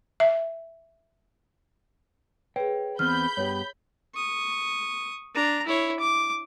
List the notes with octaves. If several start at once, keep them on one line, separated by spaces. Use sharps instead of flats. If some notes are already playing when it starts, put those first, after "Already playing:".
E5
G#4 B4 C#5 G5
E2 B3 C4 B5 F6 G6
G2 B3 G4 C#5
C#6 D#6
D4 A#5
E4 C#5
D6